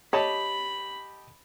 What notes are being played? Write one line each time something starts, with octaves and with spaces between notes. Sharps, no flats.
G4 C#5 D#5 A5 B5